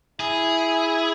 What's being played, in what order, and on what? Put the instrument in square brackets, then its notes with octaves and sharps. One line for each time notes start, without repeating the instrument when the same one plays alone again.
[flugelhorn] E4 [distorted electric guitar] G#4